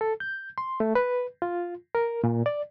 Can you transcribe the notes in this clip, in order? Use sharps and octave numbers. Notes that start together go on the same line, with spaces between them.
A4
G6
C6
A3
B4
F4
A#4
A#2
D5